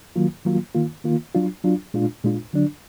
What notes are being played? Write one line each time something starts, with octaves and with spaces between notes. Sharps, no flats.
D#3 F#3 A#3 F4
D#3 F#3 A#3 F4
D#3 A#3 F4
D#3 A#3 F4
F#3 D4 F4
F#3 D4 F4
A#2 G#3 D4 F4
A#2 G#3 D4 F4
D3 F#3 D4